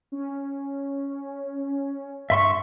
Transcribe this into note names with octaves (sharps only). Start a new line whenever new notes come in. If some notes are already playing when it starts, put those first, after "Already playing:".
C#4
G2 E5 C6 C#6